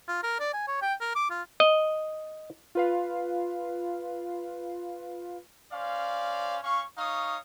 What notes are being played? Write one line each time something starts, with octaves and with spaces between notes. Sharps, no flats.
F4
A#4
D5
G#5
C#5
G5
A#4
D6
F4
D#5
F4 B4 F5
C#4 C5 D5 F5
C#4 F5 C#6
D#4 C#5 F5 C#6 D#6